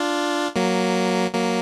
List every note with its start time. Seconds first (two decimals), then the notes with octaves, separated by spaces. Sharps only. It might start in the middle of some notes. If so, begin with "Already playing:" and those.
Already playing: D4 F4
0.56 F#3 A#3
1.34 F#3 A#3